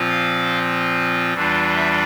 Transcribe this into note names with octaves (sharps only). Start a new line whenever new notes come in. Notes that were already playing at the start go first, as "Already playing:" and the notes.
Already playing: A#2 F3 C4 F4
F5
E2 E3 G3 D4 F4
E5